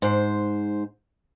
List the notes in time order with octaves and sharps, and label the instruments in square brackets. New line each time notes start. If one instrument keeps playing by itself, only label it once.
[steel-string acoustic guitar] G#2 C5